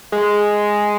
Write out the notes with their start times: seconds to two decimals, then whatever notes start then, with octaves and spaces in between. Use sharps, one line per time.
0.12 G#3